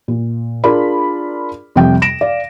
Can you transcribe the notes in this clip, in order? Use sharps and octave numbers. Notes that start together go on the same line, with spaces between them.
A#2
D4 F4 G#4 A#4 D5 B5
F2 C3 G3 G5
A#6 D7 E7
D5 F5